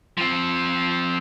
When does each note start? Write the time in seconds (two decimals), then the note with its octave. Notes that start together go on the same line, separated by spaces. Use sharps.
0.18 F3 C4